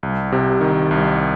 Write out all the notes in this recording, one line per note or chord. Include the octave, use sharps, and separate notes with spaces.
C2
C3
D#3
C2